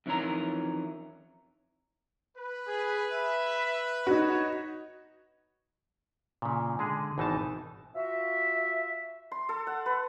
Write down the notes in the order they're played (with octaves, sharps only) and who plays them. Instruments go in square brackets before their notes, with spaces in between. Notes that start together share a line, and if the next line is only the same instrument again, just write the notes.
[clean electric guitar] F2 D#3 E3 C#4 C#5 A#5
[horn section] B4
[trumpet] G#4
E5
[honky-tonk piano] D#4 F#4 [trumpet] C#5
[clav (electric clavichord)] A#2 C#3
D3 G#3 G#4
G#1 B2 E3 D#4 E5 A5
[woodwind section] F4 F#4 E5
[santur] C6
A4
F#5
B4